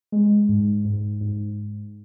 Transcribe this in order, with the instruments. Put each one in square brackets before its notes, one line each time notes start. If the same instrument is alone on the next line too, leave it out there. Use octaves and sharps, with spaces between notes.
[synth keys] G#3
G#2
G#2
G#2